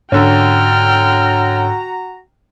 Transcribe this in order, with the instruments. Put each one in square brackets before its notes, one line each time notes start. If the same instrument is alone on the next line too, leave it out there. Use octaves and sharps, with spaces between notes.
[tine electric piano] G#2 [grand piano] D3 C#4 [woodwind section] F#4 A#5 [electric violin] G5 F6